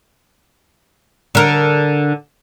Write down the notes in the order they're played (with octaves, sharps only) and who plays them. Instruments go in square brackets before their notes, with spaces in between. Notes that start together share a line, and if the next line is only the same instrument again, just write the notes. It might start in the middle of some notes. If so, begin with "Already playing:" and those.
[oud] D3 A#4